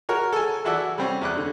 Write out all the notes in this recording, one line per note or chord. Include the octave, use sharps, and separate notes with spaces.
F#4 A#4 C#5
A4 G#5
E3 E4 F#4 A4 D5 E5
G3 C4 C#4
E2 D5 F#6
D3